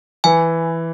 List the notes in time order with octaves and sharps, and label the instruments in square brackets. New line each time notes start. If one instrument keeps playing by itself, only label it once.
[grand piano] E3 [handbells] G#5